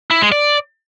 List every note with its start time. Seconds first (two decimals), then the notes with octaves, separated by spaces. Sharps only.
0.11 E4
0.21 G#3
0.32 D5